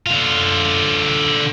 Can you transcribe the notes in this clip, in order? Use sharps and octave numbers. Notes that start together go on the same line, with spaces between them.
D3 F4